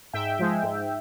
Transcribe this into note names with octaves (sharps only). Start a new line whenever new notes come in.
G#2 E5 G5
F3 G#3
G#2